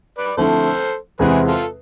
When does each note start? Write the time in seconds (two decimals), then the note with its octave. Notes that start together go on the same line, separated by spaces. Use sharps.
0.18 B4 D5
0.37 D3 F3 A3 C4 E4 A4 C5
1.19 E2 C3 G#3 C4 E4 G#4 B4
1.47 F4 A4